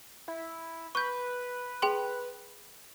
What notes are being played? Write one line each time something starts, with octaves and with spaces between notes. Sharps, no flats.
E4
B4 C#6 G6
G#4 G5 C6